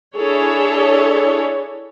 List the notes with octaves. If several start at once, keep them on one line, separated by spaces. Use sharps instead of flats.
D4 E4 G#4 A4 C#5